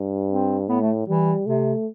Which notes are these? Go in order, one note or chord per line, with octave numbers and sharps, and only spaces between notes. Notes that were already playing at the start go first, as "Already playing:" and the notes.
Already playing: G2
C4
A2 B3
A3
E3 G3
C3 A3